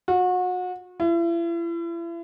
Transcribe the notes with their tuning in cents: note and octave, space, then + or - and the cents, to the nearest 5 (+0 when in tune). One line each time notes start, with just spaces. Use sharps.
F#4 -30
E4 +40